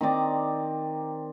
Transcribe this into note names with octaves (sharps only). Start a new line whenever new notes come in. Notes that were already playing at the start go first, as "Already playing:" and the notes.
D#3 C4 D5 A#5